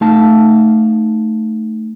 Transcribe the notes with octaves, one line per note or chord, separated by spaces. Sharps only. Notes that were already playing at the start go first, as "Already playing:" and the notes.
A3 D#4 F5 A5